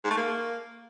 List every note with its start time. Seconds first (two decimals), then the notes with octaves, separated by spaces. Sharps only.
0.04 G#2
0.11 A3
0.17 A#3